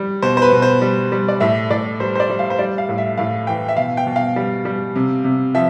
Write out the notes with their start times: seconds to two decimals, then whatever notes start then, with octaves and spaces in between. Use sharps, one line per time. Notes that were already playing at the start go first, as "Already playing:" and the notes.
Already playing: G3
0.23 B2 C5
0.37 C5
0.42 B4
0.52 B2
0.62 C5
0.82 G3
1.12 G3
1.28 D5
1.40 A2 E5
1.70 A2 D5
2.00 G3 C5
2.15 C5
2.20 D5
2.30 G3
2.39 F5
2.50 C5
2.59 G3 D5
2.78 F5
2.89 A2
2.98 E5
3.18 A2 F5
3.47 E3 G5
3.69 E5
3.76 B2 F5
3.97 G5
4.07 B2
4.16 F5
4.36 G3
4.65 G3
4.95 C3
5.24 C3
5.54 F3 E5